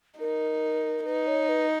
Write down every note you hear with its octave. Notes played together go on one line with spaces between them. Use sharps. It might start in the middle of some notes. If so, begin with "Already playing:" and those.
D#4 A#4
D#4 B4
C#5
B4